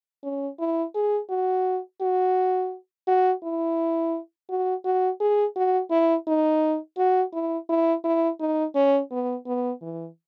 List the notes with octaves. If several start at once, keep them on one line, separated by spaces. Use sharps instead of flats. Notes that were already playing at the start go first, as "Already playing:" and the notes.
C#4
E4
G#4
F#4
F#4
F#4
E4
F#4
F#4
G#4
F#4
E4
D#4
F#4
E4
E4
E4
D#4
C#4
B3
B3
E3